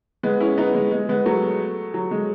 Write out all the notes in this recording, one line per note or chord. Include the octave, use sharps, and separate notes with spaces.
G#3 B3
C#4 E4
B3 D#4
G#3
G#3
G#3 B3
F#3 A3
F#3
G#3